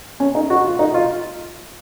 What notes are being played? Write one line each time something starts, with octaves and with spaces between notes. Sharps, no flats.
C#4
D#4
F#4
F4
D#4
F4